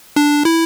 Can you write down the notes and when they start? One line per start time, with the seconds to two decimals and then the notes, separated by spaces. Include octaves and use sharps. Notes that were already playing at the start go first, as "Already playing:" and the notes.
0.16 D4
0.45 E4